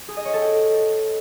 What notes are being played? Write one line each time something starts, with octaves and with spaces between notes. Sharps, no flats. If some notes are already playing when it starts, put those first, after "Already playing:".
G#4
D#5
C#5
A4
G5